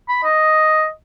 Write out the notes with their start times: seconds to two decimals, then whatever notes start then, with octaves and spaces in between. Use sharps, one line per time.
0.09 B5
0.24 D#5